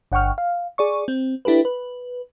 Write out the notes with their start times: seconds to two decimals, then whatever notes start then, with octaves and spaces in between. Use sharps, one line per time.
0.12 G1 F#5 G5 C#6 F6
0.38 F5
0.78 G#4 D5 C#6
1.08 C4
1.45 D4 E4 G4 A4 B4
1.65 B4